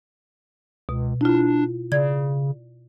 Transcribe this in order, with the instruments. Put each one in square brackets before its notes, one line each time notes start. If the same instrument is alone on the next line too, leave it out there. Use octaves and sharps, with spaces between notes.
[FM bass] C#2 [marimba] B2
[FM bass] D4 [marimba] E4 F4
[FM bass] C#3 [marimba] D5 G#6